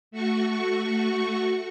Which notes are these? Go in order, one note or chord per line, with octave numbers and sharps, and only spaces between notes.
A3 F#4 C#6